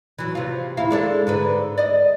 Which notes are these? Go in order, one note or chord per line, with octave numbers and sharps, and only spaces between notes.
E3 F#3
C3 F4
D#2 E4 F5
G#3 D4 A4
G#2 D3 B4
D5 D#5